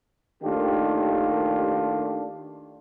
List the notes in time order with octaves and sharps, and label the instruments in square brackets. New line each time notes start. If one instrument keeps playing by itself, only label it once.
[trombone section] D#2 D#3 A3 D4 F4 G4